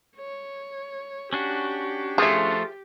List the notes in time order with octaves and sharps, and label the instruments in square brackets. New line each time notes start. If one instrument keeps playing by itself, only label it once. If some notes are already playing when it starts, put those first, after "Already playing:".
[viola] C#5
[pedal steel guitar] C#4 D4 F#4 [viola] G4
[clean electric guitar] F3 A3 F4 [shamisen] G#4 E5